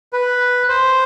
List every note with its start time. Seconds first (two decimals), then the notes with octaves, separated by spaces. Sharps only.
0.13 B4
0.69 C5